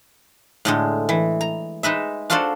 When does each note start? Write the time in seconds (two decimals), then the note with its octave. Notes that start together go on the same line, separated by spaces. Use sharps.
0.65 A2 D3 G#3
1.09 E3
1.41 A#5
1.83 G#3 D#4 B4 E5
2.30 D4 F4 F#4 A4 C5 D5